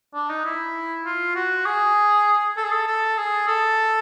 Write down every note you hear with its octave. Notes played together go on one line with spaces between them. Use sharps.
D4
D#4
E4
F4
F#4
G#4
A4
G#4
A4
A4
G#4
A4